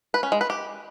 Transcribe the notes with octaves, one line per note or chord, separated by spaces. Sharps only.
B4
C#4
G#3
B4
G4